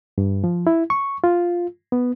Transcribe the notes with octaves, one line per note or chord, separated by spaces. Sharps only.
G2
F3
E4
C#6
F4
B3